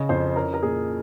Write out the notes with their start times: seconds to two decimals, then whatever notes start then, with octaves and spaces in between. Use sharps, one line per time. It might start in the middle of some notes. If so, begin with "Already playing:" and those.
Already playing: C#3 D#5
0.09 F2 C5
0.36 C#4 A#4
0.54 A#4
0.63 A#2 G#4